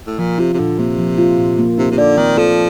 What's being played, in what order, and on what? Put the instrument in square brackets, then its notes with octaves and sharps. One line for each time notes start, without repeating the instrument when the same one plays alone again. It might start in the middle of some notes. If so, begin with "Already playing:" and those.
[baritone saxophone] A2
[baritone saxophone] A#2 [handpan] F3
[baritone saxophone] C3 [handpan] F4
[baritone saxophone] C3
[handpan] A#2 [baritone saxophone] D3
[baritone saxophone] C3 [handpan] A#3
[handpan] F3
F4
A#2
A#3
[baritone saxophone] C3 [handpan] D#4
[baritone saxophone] C3
[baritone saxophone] D3 [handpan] D5
[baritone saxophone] D#3 [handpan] C4
[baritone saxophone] F3 [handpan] A4